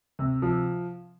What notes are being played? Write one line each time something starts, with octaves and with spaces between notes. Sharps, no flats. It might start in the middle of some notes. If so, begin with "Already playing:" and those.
C3
F3